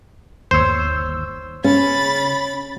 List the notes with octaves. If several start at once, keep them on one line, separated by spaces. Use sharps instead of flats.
G1 D#2 C5 C#5 E6
C#3 C#4 B5 A6